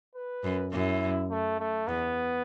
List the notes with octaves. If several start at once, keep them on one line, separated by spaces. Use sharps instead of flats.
B4
F#2
F#2 E4
A3
A3
E2 B3